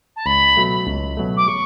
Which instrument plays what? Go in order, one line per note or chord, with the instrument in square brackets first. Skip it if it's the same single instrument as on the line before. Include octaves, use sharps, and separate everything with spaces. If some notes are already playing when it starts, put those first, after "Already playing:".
[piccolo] A5
[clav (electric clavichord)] C#2 [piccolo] B5
[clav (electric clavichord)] B2 F#3 A3
C#2
B2 F#3 A3
[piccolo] D6
C#6